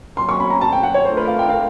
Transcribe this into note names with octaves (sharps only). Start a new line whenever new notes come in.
F#3 A#3 C#4 C6
C#6
B5
A#5
A5
G5
F#5
C#5
A3 D4 F4 A#4 C5
B4
F5
G5
F5